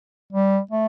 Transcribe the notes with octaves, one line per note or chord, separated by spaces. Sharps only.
G3
A3